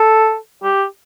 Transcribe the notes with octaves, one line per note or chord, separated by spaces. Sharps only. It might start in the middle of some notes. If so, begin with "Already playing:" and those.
Already playing: A4
G4